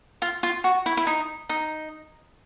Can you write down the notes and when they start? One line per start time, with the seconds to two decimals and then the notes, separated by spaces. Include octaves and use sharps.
0.22 F4
0.43 F4
0.64 F#4
0.86 E4
0.97 E4
1.07 D#4
1.49 D#4